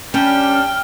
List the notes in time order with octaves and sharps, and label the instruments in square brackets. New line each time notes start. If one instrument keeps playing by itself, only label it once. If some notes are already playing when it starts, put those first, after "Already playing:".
[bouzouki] G3 D4 [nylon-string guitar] C#4 [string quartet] G5 [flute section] F6